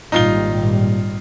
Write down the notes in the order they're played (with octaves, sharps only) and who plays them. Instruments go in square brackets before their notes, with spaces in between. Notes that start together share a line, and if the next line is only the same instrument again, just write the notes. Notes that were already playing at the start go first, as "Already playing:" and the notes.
[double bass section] G#1 A#2 G3 [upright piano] D#4 F4 G7